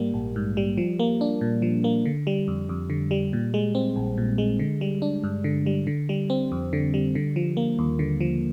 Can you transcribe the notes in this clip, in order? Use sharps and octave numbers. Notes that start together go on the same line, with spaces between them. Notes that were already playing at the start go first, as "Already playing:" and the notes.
Already playing: G#2 G3 A#3
A#1
G#2
G3
F3
A#3
D4
A#2
F3
A#3
D3
G3
F2
F2
D3
G3
A#2
G#3
C4
A#1
A#2
G#3
D3
G3
D4
G2
D3
G3
D3
G3
C4
F2
D3
G3
D3
F3
A#3
D#2
D3
F3